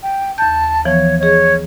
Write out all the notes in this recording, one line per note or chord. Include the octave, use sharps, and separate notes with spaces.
G5
D#2 A5 G6
E3 F3 B3 C#5
G#4 C#5 D#5